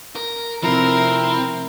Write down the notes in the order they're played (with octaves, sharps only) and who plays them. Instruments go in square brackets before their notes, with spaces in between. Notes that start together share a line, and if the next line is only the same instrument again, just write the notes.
[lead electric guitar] A#4
[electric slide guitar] C3 F3 [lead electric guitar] C4 [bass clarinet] E4 [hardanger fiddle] A#4